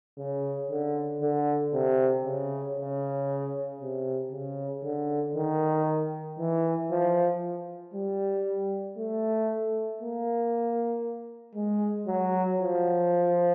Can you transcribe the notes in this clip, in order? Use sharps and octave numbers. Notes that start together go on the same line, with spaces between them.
C#3
D3
D3
C3
C#3
C#3
C3
C#3
D3
D#3
E3
F3
G3
A3
A#3
G#3
F#3
F3